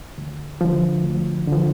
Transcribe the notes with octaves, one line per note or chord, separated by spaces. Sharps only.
D2
D3 F3
D2
D3
F3